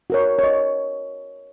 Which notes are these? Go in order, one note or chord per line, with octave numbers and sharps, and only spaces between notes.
F#4 A#4 C#5
C#5
D#5